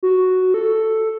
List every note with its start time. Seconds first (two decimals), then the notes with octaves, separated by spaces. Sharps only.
0.03 F#4
0.54 A4